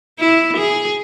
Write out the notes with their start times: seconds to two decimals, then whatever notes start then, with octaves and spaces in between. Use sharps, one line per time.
0.19 E4
0.57 G#4